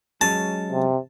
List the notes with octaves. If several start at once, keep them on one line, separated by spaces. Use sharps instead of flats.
F#3 G#3 C#4 A5
C3